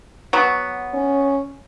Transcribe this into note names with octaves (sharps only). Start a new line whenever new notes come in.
F#3 B3
C#4